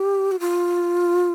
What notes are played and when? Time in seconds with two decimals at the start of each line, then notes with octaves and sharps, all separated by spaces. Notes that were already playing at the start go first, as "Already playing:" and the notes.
Already playing: G4
0.31 F#4
0.40 F4